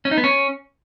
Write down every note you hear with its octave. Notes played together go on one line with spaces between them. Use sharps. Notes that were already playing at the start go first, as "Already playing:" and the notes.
C#4
D#4
B3
C#4